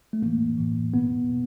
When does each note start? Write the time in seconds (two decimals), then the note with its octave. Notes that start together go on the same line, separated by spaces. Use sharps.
0.13 A3
0.22 A2 E3 A#3
0.58 A2 E3
0.94 B2 B3
1.29 B2